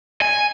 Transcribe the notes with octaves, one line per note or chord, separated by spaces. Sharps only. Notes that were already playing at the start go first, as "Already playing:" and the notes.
G#5